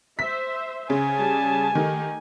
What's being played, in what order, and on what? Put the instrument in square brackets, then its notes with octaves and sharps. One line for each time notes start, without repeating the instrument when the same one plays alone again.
[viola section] C5 E5 [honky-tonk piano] B6
[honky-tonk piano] C#3 [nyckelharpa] G#5
[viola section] G3 A5
[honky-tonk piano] D#3 [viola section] A3 D#4 G4